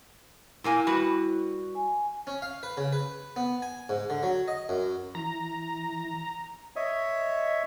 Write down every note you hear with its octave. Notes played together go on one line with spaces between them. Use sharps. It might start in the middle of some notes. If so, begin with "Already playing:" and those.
A#2 A#3 E4 G#5
G3 F#4 B4
G#5
C#4
F5
B4
C#3
B4
B3
G#5
G#2
D3
F#3
D#5
F#2
E3 A#5
C#5 D#5 E5